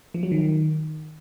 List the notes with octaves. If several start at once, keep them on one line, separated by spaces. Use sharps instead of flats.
F3
F#3
D#3